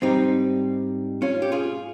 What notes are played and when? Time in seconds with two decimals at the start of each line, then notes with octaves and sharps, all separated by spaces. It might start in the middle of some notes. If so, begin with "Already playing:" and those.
0.02 G#2 G3 C4 D#4
1.22 C#4 F4
1.42 G4
1.52 F4 G#4